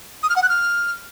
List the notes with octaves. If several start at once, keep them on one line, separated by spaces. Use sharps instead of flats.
D#6
F6
F#5
F#6
F6